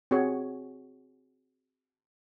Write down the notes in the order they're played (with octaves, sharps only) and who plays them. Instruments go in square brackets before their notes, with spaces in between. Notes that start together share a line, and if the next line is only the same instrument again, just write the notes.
[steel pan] C4 F#4 G#4 C#5